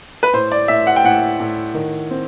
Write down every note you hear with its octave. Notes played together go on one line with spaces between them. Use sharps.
B4
A2 C5
D5
A2 E5
F#5
G5
A2 F#5
A2
D#3
C4